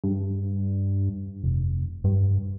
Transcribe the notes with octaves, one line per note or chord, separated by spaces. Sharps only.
G2
F1
G2